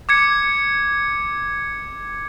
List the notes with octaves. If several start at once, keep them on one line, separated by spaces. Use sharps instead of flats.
D6 G#6 C#7